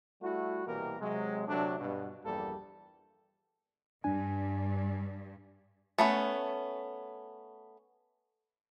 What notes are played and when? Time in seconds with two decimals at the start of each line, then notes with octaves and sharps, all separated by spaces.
0.22 G3 A3 E4 F#4
0.67 C2 B2 E3 A#3 G4 A#4
1.01 C3 F#3 G#3
1.48 D2 C3 F#3 A3 D4
1.80 G2 B2
2.25 A#1 E2 G2 G3 A#3 A4
4.04 G2 D4 G#5
5.98 A3 B3 C#4